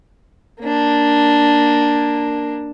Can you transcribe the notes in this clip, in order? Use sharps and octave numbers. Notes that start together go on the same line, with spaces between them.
A#3 D4